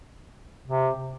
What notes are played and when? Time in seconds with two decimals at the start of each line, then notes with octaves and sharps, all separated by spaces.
0.67 C3